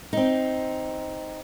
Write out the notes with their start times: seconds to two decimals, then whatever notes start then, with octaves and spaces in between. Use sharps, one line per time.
0.13 C4 D#4